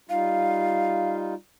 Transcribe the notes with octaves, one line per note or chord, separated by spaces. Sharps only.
G3 D#4 F4 F5